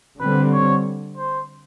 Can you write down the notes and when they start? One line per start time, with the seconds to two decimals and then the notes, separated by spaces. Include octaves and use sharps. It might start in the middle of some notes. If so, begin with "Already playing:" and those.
0.19 D3 G3 C4 B4
0.53 C#5
1.17 C5